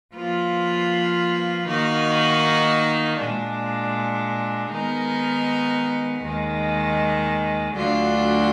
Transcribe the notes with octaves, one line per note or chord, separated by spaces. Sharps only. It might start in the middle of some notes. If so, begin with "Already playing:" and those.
F3 A#3 F4 B4
D#3 A#3 D#4 F#4
A#2 G#3 D4
D#3 G#3 B3 D#4 A#4
D#2 D#3 G#3
D2 D3 F#3 D4 F4